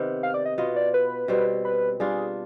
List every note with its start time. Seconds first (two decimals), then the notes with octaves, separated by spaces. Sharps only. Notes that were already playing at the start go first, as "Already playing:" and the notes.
Already playing: C3 D#3 B3
0.23 F5
0.34 D5
0.46 D#5
0.58 B2 B3 F4 D#5
0.76 D5
0.94 B4
1.28 B2 G3 C4
1.65 B4
2.00 G3 D4 F4 G#4